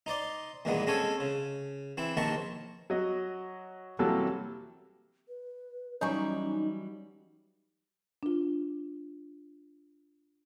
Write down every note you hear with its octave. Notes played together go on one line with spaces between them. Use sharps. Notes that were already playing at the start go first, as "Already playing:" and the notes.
D#4 C5 D5 C6
E2 G2 A#2 D#3 G#3 B3
G#3 C4 C#4 A4 C#5 G#5
C#3
E3 C4 E4
A#1 D#2 D#3 C4 A5 C#6
F#3 F#4 D#5
C3 E3 F#3 G3 A#3 A4
B4
E3 F#3 G3 C#4 D#4 C#5 G#5 C#6
D4 F4